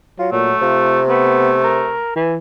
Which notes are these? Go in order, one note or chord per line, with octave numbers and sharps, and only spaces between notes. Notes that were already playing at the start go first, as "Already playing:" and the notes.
F#3 F4
A#2 F#3 A3
C3 F4
A3 B3
A#4
E3